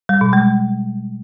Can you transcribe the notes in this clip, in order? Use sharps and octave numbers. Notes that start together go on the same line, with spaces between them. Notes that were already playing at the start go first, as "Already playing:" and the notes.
G3
B2
G#3